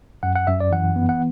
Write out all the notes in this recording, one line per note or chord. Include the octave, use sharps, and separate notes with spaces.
F#2 F#5
F#5
F#2 E5
D5
E3 F#5
B3
F#5